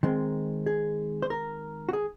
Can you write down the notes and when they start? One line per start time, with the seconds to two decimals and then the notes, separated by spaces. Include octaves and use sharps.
0.03 D#3 G#3 C4
0.66 G#4
1.22 C5
1.30 A#4
1.89 F#4
1.93 G#4